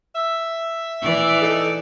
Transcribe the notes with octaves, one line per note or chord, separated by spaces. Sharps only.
E5
E3 D5
D#4 A4